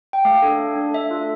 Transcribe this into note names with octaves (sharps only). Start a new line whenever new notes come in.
G5
A3 F5
D4 A4
A3
D4
A4
D4 E5
F4 A4